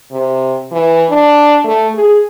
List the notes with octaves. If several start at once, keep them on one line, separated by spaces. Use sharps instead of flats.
C3
E3
D4
A3
G#4